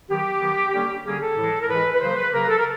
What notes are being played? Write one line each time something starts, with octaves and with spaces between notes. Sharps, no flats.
D#3 F#3 B3 G4
D#3 F#3 B3
D3 G3 A#3 C#4
D3 G3 A#3 C#4 G#4
A4
A2 E3 G#3
A#4
A2 E3 G#3 B4
B4
C#3 F#3 A#3 C5
B4
C#3 F#3 A#3 A#4
A4
A#4